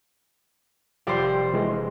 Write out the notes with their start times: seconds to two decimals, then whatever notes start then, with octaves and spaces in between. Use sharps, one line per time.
1.07 F1 F4 G4 C5 D5 C6
1.54 E3 G#3